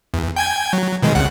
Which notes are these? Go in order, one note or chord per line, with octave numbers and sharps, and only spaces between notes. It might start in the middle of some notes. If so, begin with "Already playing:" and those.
E2
G5 G#5 G#6
F#3
B2 D#3 G#3
C2 C#3 F#5